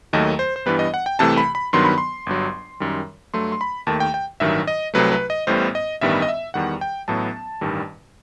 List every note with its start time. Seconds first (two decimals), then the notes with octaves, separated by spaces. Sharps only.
0.13 D#2 D#3 F#3 A3 D#5
0.39 C5
0.56 C5
0.66 G2 E3 G3 B3 B4
0.79 D#5
0.94 F#5
1.06 G5
1.19 C2 C3 E3 A3 A5
1.37 B5
1.55 B5
1.73 G2 D#3 F#3 B3 C6
1.85 B5
1.98 C6
2.26 G1 G2 F#3
2.80 F#2 D#3 G3
3.33 G2 F#3 A3 C6
3.52 C6
3.61 B5
3.87 D#2 D#3 A3 A5
4.00 G5
4.14 G5
4.40 A1 G2 D#3 F#3 E5
4.67 D#5
4.94 C2 C3 F#3 A3 B4
5.12 B4
5.30 D#5
5.47 A1 A2 G3 B3 C5
5.75 D#5
6.01 A1 G2 D#3 G3 B3 E5
6.22 D#5
6.28 E5
6.54 E2 D#3 G3 F#5
6.81 G5
7.08 A1 A2 F#3 B3 A5
7.61 A1 G2 D#3 G3